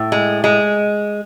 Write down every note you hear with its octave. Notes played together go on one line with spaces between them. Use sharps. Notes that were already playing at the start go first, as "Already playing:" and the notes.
Already playing: A2
G#3
G#3